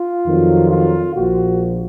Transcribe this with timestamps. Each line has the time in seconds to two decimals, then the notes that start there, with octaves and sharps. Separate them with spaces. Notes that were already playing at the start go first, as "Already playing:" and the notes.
Already playing: F4
0.25 F2 D#3 F#3
0.71 F4
1.16 A#1 A#2 F3 F#4